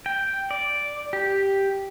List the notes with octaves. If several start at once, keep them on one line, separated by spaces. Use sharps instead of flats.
G5
D5
G4